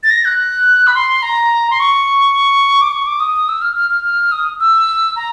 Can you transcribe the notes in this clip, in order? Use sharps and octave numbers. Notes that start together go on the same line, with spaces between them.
A6
A#6
F#6
B5
C6
A#5
C6
C#6
D6
C#6
D6
D#6
E6
F6
F6
F6
F6
D#6
E6
A#5